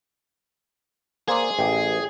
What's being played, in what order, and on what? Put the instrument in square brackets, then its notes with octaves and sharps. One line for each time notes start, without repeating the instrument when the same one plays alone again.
[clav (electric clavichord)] A#3 C5 D5 [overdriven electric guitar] G#4
[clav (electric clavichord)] A1 G4